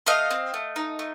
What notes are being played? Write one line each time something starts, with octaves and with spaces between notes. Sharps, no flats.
A3 D#5 F5
C4
A3
D#4
A3